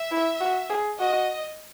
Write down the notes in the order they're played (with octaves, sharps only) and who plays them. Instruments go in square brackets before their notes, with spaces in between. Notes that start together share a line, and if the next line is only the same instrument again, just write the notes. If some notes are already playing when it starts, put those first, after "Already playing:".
Already playing: [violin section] E5
[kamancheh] E4
F#4
G#4
[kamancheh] F#4 [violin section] D#5